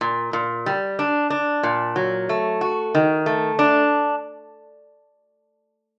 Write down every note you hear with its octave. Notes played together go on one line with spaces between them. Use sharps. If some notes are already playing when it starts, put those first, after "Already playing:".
A#2
A#2
G3
D4
D4
A#2
F#3
A3
F#4
D#3
A3
D4